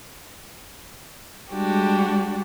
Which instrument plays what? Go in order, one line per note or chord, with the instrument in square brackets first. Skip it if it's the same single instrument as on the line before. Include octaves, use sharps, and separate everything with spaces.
[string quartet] G3 G#3 D4 F#4 G4